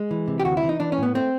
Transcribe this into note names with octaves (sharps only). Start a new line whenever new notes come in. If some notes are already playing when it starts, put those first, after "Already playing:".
Already playing: G#3
E3
C3
G4
D2 F#4
E4
E3
D#4
E3 D4
C#4
A2 B3
A3 C4